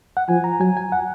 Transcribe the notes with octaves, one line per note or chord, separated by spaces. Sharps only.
F#5
F3 G#5
A#5
F#3 G#5
G#5
F#5